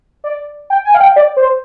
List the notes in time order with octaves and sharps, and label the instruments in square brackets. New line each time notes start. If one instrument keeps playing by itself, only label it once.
[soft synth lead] D5
G5
G#5
F5
G5
D5
C5